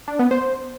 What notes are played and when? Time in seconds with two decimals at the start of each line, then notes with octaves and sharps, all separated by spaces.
0.08 D4
0.19 B3
0.31 C5